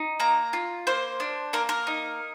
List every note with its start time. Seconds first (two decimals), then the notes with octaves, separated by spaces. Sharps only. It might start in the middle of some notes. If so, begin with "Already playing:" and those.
Already playing: D#4
0.20 A#3 A#5
0.53 F4
0.87 A#3 C5
1.20 D4
1.53 A#3 A#4
1.69 A#4
1.87 D#4